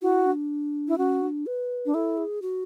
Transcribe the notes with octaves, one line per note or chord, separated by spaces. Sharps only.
E4 F#4
D4
E4
C#4 F#4
D4
B4
D4
E4 A4
G#4
F#4